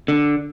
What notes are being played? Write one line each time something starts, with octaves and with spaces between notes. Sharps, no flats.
D3